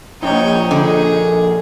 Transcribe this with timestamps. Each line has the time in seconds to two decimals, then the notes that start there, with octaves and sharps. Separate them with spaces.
0.22 A#1 D#4 C#5 G5
0.71 D3 G#4